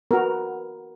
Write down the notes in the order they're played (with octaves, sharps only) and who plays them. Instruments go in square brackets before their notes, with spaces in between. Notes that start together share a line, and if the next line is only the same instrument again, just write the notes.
[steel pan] B3 F#4 A#4